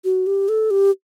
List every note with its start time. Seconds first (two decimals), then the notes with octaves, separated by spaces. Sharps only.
0.05 F#4
0.27 G4
0.49 A4
0.71 G4